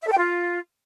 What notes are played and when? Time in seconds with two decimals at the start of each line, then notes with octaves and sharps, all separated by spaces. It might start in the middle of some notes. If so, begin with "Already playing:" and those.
0.02 E5
0.07 A4
0.13 G5
0.18 F4